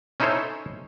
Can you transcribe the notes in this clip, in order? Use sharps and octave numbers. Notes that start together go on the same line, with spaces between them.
C#4 D#4 E4 A4 C5 C#5